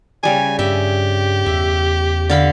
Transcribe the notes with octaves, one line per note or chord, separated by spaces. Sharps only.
C#3 G3 D5 G#5
G2 G4 E5
E2 E5
D3 F5 B5